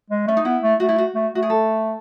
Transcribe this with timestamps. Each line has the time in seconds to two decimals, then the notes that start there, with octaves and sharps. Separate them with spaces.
0.10 G#3
0.27 A3 C#4
0.37 D#4
0.45 B3 E4
0.62 A3
0.80 A3 F#4
0.89 E4
0.98 F#4
1.15 A3
1.33 A3 F#4
1.42 G#4
1.50 A4